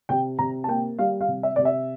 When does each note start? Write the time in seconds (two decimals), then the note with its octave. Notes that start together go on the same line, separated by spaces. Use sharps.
0.09 C3 G5
0.39 C3 A#5
0.64 A5
0.68 A#3 G5
0.99 G3 F5
1.21 F5
1.28 C3
1.43 E5
1.56 C3 D5
1.65 E5